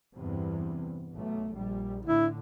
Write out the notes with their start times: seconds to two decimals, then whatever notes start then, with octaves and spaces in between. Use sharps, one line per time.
0.16 E2 G2 C3
1.15 B1 A3
1.55 A#1 G3
2.05 A2 D3 E4